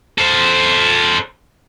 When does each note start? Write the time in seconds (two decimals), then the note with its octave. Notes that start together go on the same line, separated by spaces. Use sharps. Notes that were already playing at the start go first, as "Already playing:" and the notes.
0.18 A4 C5